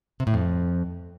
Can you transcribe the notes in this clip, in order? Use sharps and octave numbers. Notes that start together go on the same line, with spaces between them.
C3
A2
F2